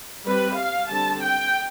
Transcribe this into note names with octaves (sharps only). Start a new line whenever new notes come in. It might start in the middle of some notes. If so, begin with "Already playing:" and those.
G3 C4 B4
F5
D3 G3 C4 A5
G5